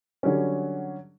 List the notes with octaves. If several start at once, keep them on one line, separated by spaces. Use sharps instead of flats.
D3 F#3 G3 C#4